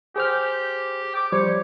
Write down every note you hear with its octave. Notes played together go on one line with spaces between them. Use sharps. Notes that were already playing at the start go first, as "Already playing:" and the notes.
G4 G#4 C5 F6
D6
F3 G3 C5 C#5